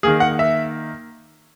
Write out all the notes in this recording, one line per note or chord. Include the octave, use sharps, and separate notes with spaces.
D#3 A#3 G#4
F#5
E5